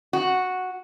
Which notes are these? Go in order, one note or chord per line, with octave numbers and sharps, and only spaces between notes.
F#4